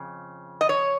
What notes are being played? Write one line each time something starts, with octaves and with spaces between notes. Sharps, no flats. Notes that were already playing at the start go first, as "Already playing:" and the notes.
Already playing: F2 C#3
D#5
C#5